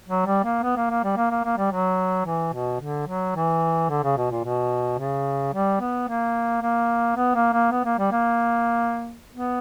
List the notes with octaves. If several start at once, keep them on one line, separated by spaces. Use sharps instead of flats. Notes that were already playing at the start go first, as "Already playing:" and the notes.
F#3
G3
A#3
B3
A#3
A#3
G3
A#3
A#3
A#3
G3
F#3
E3
B2
D3
F#3
E3
D3
C#3
B2
A#2
B2
C#3
G3
B3
A#3
A#3
B3
A#3
A#3
B3
A#3
G3
A#3
B3